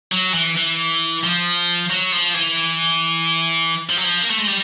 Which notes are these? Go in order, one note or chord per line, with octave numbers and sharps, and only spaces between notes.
F#3
E3
E3
F3
F#3
F3
E3
F3
F#3
F3
A#3
A3
G#3
G3